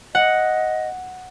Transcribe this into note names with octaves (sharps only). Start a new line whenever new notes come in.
D#5 F#5